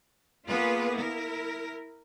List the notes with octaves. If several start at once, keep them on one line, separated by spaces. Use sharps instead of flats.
A#3 B3 F4 G#4 B4
E4 A#4